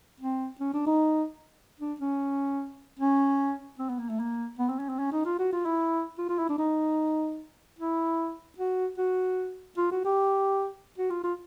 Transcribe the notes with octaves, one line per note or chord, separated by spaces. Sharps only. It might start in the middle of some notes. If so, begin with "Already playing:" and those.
C4
C#4
D4
D#4
D4
C#4
C#4
C4
B3
A#3
A3
A#3
B3
C4
C#4
C4
C#4
D#4
F4
F#4
F4
E4
F4
F4
E4
D4
D#4
E4
F#4
F#4
F4
F#4
G4
F#4
F4
F4